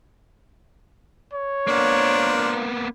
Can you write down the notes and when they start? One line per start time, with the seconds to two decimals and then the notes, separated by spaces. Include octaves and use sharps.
1.33 C#5
1.68 A#3 B3 D4 F4 A#4 C5